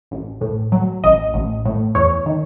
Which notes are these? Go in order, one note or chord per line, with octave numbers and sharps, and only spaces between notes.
A1
A2
F#3
A1 D#5
A1
A2
E2 C#5
D#3